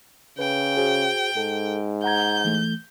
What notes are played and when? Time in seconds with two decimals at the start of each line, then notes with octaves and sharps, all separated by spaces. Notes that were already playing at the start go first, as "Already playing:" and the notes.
0.39 C#3 B4 G5
0.77 F#4 G#4 C5
1.37 G#2 A4
2.04 F#5 A#5 G6 G#6
2.44 E3 A3